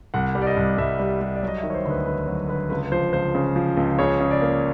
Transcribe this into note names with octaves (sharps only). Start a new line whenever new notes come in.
C2 F#5
G3
D5
D#5
C2
C2 E5
G3
G3
D5
F#3 D#5
E5
D#3
C#5
C5
D2
B4
D#3 B4
F#3
D2 B4
C#2 B4
F3 C5
C#2 C5
C#3
F3
C#2
C#3 C#5
C#3
D5
A#3